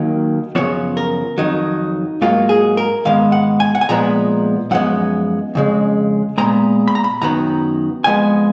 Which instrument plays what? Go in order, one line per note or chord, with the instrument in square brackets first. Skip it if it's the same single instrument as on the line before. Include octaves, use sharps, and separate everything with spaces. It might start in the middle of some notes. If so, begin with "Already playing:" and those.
Already playing: [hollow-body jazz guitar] D#2 D#3 F#3 A#3 D#5
F#2 C#3 F3 B3 C#5
A#4
F2 D#3 F#3 D#4
G#2 F#3 A#3 F4
G#4
A#4
G#2 D#3 G#3 B3 F5
F#5
G#5
F#5
G#5
A#2 F3 G#3 B3 A#5
F#2 F3 G#3 B3 F#5
F2 C#3 G#3
A#2 G#3 B3 A#5
B5
A#5
B5
F#2 D#3 F#3 B3 A#5
F2 F3 G#3 B3 G#5